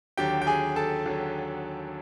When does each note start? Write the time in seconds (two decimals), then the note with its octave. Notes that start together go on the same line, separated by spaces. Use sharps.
0.17 D#2 D3 F#3 G4 G5
0.42 G5
0.47 G#4 G#5
0.76 A4 A5
1.06 D#2 D3 F#3